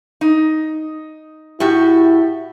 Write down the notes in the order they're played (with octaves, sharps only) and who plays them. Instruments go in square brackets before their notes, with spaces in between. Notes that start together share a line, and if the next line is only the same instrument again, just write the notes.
[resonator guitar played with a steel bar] D#4
[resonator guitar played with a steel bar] A2 F#4 G4 [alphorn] E4